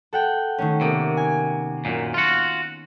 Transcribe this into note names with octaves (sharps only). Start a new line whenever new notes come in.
A4 F#5 G5
D#3 A3 C#4
C3 A#3 B3
G#5
F#2 A#2
F4 F#4